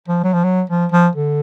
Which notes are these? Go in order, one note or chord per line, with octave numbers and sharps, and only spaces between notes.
F3
F#3
F3
F#3
F3
F3
D3